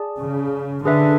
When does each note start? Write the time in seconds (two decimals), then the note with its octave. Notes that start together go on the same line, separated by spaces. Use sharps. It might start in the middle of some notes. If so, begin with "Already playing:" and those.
Already playing: G#4 D5 A5
0.20 C#3
0.85 D3 G#4 B4 E5